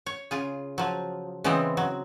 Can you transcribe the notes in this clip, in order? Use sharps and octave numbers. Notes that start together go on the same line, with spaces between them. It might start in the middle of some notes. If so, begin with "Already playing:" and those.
C#5
C#3 F4 G#4
F3 F#3
C#3 E3 G#3 B3 C4
F#3